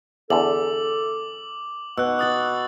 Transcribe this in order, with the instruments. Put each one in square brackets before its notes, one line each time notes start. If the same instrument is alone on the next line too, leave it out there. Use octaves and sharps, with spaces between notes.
[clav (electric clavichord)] E2 D3 [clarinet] A4 [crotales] D6 F#7
[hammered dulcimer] B2 [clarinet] F#5 [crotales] E6 F#6
[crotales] D#6 A6 F#7